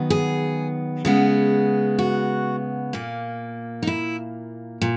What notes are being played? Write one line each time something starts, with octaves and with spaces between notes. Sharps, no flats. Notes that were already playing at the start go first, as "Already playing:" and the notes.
Already playing: D#3 F#3 B3
G#4
C#3 G#3 B3
F#4
A#2 A#3
D#4
E4
A#2